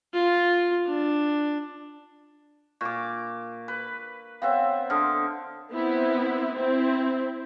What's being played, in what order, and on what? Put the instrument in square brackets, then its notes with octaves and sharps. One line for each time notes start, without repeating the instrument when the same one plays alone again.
[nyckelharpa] F4
D4
[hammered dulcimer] A#2 D6 [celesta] C#6
[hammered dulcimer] B4
[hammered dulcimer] B3 C4 E5 [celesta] C#5 F5
[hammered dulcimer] D3 [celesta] C6 D#6 F6
[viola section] B3 C4 E4
C4 E4